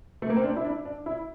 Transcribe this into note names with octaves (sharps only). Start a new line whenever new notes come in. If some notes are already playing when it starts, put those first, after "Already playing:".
A3
A#3
C4
D4
E4
D4
D4
E4